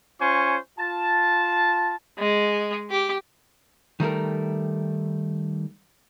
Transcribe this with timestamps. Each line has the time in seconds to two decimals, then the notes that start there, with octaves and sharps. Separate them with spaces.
0.20 C#4 F4 C5 G#5 C#6
0.79 F4 A5
2.19 G#3
2.90 G4 D6
4.00 D#3 G3 A3 A#4